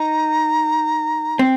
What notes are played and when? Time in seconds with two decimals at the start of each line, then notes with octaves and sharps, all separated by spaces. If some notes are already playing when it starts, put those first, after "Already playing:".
Already playing: D#4 A#5
1.39 C4 G5